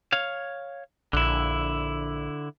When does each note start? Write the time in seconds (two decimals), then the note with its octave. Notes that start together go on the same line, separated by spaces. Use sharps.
0.12 C#5 F5
1.13 A#1 D3 E4